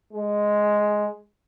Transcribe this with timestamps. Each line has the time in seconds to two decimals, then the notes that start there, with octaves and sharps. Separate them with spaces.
0.12 G#3